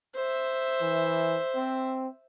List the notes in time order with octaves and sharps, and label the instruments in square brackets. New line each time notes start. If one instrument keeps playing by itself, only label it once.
[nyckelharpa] C5 E5
[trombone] E3
C4